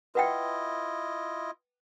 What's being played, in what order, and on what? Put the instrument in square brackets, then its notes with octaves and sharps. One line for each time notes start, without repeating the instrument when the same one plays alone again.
[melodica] E4 F4 D#5 [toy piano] B4 F#5 G5